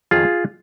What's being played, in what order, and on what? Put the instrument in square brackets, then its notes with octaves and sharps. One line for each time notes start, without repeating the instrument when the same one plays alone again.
[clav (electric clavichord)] F2 D#3 F4 G#4